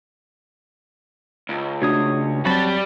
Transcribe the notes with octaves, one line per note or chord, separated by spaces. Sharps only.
C#2
C#3 A3 D4 F#4 C#5 D#6
C2 F#3 G3 C4 F#4 A5 B5